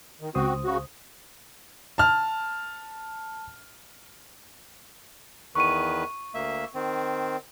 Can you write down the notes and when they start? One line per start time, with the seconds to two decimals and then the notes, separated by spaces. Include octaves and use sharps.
0.21 D#3
0.35 C#2 C4 F#4 C5 D#6
0.64 C#3 F#4
1.98 A5 F6
5.55 E2 D#3 B4 C#6 D#7
6.35 D2 A#3 E5
6.74 D#3 C4